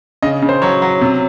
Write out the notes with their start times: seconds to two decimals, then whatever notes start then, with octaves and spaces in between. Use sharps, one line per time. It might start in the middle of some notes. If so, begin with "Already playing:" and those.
0.22 C#3 D#5
0.42 C#3
0.49 C5
0.62 F#3 C#5
0.82 F#3
1.01 C3